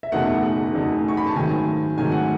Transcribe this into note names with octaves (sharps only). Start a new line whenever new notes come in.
E5
F#1 E2 B2 A3 D#4 F#5
F#1 E2 B2 A3 D#4
C#6
B5
A5
G#2 D#3 F#3 A3 G#5
G#2 D#3 F#3 A3 G#5
F#5